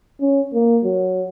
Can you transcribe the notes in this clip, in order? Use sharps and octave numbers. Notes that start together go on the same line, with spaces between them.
C#4
A#3
F#3